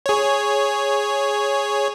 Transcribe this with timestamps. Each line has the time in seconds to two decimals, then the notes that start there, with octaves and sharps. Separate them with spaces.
0.06 G#4 C#5